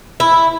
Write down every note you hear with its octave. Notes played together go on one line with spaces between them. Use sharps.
E4